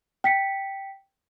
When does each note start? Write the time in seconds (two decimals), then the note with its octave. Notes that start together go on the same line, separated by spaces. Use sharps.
0.24 G5 B6 C#7